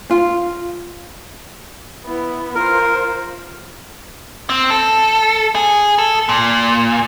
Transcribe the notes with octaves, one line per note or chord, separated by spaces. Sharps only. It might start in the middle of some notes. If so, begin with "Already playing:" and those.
F4
B3 E4
F4 A#4 C5
C4
A4
G#4
A4
A#2